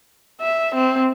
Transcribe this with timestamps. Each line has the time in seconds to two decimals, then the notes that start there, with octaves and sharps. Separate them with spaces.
0.41 E5
0.75 C4